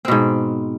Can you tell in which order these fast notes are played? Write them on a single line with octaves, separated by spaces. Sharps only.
C4 B2 G#2